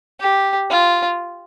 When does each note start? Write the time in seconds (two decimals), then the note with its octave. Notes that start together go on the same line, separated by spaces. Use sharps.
0.21 G4
0.71 F4